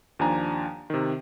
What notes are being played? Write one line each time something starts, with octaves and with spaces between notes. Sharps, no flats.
D#2 F3 D4 G#5 A#5
C3 D#3